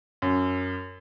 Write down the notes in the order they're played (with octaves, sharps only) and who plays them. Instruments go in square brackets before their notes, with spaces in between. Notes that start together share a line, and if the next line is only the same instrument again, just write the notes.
[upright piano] F#2